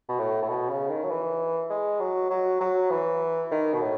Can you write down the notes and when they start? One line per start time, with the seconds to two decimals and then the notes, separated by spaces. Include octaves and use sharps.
0.09 B2
0.19 A2
0.42 A2
0.49 B2
0.69 C#3
0.89 D#3
1.04 F#3
1.10 E3
1.70 G#3
2.00 F#3
2.30 F#3
2.60 F#3
2.90 E3
3.51 D#3
3.74 B2
3.81 A2